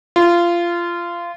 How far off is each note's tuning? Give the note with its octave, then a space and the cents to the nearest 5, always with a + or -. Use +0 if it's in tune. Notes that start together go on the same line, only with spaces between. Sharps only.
F4 -20